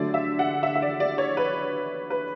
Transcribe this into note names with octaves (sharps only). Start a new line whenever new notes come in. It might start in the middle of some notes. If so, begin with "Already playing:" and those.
Already playing: D3 F#3 A3 D5
E5
F#5
E5
E5
D5
D5
C#5
B4
B4